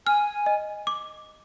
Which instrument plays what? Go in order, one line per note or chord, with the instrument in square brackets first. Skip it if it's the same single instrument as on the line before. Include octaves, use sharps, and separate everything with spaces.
[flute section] G#5 [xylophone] F6
[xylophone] D#5
D6